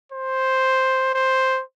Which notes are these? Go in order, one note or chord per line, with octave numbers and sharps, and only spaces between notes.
C5
C5